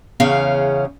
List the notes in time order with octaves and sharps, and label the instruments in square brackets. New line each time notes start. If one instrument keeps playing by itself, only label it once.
[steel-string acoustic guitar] E2 C#3 C#4 F5